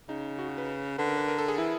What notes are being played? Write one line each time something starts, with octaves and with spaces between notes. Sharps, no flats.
C#3 D#4
F#4
F#4
B4
D3 B4
A#4
B4
A#4
A4
G#4
E3 E4